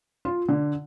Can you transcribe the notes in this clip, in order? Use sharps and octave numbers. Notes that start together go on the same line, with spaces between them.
F4
D3